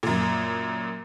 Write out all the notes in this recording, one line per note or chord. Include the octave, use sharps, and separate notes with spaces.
F#2 A#2